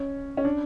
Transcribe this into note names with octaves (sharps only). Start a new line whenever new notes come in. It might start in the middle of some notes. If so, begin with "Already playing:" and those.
Already playing: C#4
C#4
D4